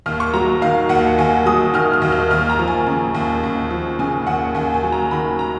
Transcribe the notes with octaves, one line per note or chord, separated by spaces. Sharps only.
D#2 F6
C#6
F#3 A#5
D#3 F5
D#2 F#5
D#2 G#5
F#3 D#6
D#3 F6
F6
D#2
F6
D#2 F6
A#5
F3
G#5
C#3
D#2
D#2
F3
C#3 G#5
D#2 F#5
D#2 G#5
G#5
F#3
A#5
D#3 B5
A#5